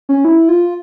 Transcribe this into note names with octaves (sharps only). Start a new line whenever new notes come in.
C#4
E4
F4